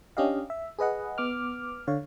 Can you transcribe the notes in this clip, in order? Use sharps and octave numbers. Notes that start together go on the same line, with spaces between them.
C#4 D4 G4 D#5 F5
E5
G#4 B4 D#5 F#5
B3 D6 F6
D3 C#5 F5